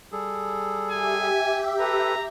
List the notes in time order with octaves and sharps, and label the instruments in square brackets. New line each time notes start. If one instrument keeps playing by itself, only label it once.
[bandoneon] G3 G#4 A4
[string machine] G4 E5 [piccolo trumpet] G#5
[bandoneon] A4 B4 [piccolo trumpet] A#5